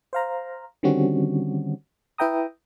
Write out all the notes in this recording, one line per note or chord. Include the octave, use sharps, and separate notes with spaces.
C5 F5 A#5
D3 D#3 G3 C4 C#4 F#4
E4 B4 E5 G5 A#5 D#6